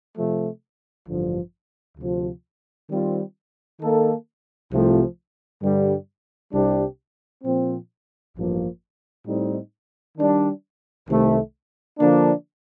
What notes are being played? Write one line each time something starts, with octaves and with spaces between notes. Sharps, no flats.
C3 F3 A3
A1 G2 D3 F3
D2 C3 F3
D#3 G3 C4 F4
D#3 A#3 D#4 A4
C2 C3 F3 A3
G2 D3 G3
C2 C3 G3 D4 G4
A#2 F3 C4
A1 G2 F3 A#3
A2 G3 C4 D#4
D#3 G3 D4
C2 C3 D#3 A3
D3 F3 A#3 D4